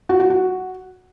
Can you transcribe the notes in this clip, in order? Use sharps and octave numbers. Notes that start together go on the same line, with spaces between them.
F#4
F#4
F#4